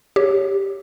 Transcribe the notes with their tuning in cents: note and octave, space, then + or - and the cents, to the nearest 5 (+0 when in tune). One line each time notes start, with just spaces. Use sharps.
G4 +0 C#5 +0